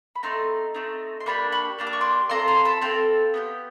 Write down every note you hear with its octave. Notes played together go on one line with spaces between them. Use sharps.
B5
A3 C4 D#4 A#5 C6
A3 C4 D#4
C6
A#3 D4 G4 B5 C#6
B5 C#6
A#3 D4 G4
D6
C#6
C6 D6
C4 F4 A4 A#5 C6
A#5 C6
A5 B5
C4 F4 A4 F5 G5
B3 D#4 G4